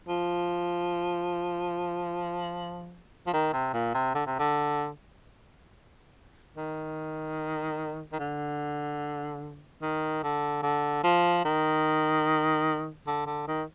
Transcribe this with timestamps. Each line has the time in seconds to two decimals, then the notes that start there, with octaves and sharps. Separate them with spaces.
0.09 F3
3.27 F3
3.33 D#3
3.53 C3
3.73 A#2
3.94 C3
4.15 D3
4.26 C3
4.39 D3
6.57 D#3
8.12 D#3
8.20 D3
9.82 D#3
10.23 D3
10.63 D3
11.04 F3
11.45 D#3
13.07 D3
13.26 D3
13.48 D#3